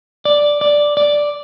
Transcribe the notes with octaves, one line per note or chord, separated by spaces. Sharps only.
D5
D5
D5